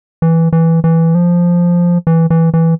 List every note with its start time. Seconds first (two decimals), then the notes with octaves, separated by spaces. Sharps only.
0.22 E3
0.53 E3
0.84 E3
1.15 F3
2.07 E3
2.30 E3
2.54 E3